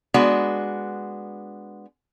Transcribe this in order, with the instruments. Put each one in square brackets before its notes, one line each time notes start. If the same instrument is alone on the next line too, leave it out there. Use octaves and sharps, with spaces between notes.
[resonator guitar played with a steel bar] G#3 B3 D4 F#4